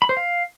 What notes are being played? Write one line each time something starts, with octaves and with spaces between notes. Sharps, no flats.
B5
C5
F5